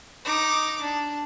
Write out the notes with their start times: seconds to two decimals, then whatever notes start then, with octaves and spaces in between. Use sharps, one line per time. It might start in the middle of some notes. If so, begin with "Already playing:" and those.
0.25 D#4 D6
0.81 D4